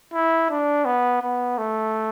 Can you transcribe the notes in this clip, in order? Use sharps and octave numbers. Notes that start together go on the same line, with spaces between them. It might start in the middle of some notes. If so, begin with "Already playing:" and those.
E4
D4
B3
B3
A3